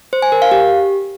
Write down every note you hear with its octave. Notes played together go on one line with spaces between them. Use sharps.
C5
G#5
A#4
F5
G4